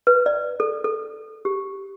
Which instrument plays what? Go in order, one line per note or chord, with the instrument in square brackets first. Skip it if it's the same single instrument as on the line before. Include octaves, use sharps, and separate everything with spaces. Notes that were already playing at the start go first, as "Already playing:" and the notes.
[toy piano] B4
D5
A4
A4
G4